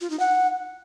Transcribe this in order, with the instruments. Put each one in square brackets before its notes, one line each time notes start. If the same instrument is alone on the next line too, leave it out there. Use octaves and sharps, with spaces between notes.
[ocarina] F4
D#4
F#5